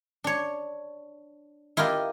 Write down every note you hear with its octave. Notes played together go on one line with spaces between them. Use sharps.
D4 C#5
E4 F4 G4 A#4 D#5